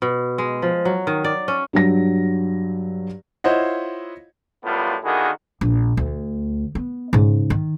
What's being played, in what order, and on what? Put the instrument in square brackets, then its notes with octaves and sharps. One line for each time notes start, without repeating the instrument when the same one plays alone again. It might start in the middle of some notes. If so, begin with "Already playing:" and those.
[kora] B2
G#3
F3
F#3
D#3
D5
C#4
[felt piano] G2 F#3 A#6
[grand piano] E4 F4 C5 C#5 D#5 F#5
[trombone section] F#2 A2 G3 B3 F4
D3 D#3 A#3 E4 F#4 G#4
[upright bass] A#1
D2
B3
G#2 C#3
D#3